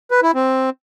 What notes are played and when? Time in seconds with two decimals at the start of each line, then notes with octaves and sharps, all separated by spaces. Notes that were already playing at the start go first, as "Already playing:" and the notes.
0.11 B4
0.23 E4
0.35 C4